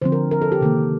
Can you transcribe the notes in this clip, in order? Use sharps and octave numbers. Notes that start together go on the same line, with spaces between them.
D3 F3 C4 C5
A#4
A#4
A4
G4
C3 D#3 A#3